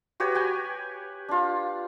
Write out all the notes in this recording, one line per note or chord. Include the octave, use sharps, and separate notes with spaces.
F#4 G4 B4 C#5
G4 G5 G#5
D4 F4